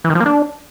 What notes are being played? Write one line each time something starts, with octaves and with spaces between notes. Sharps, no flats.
E3
D#3
F3
A#3
D4